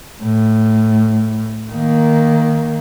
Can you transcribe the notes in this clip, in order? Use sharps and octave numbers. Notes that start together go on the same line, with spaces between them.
A2
D#3 A#3